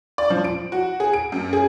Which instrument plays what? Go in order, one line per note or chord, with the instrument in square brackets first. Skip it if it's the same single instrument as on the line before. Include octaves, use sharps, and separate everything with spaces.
[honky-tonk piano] D5
F3
D7
F#4
G#4
D7
F#2
G#4